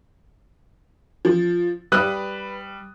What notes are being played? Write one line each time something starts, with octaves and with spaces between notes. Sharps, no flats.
F3
G3 B4 D#6 F#6